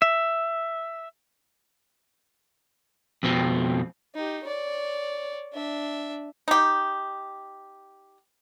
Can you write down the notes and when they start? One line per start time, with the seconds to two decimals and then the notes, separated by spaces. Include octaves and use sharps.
0.02 E5
3.23 F2 B2 C4
4.15 D#4 G4
4.44 C#5 D5
5.53 D4 E5
6.48 D#4 G4